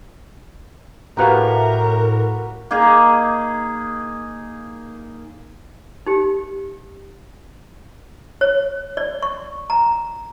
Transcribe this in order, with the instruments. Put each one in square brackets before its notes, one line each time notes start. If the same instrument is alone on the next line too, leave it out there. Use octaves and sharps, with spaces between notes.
[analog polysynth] A2 [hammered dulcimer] F#4 A#5 [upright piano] G4 B4 F5 [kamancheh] A#4
[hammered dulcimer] A#3 D#4 G#4
[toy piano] D#4 G4
C#5
D5
C#6
A#5